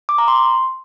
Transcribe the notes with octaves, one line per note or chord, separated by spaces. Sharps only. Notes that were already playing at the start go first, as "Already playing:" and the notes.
D6
A#5
C6